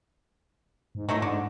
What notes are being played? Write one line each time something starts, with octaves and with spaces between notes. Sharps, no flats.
G#2
A2 F#3 A3 D#4
G#2 D3